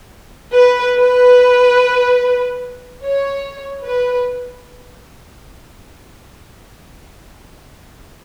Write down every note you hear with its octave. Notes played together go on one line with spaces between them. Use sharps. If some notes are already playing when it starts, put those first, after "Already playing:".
B4
B4
C#5
B4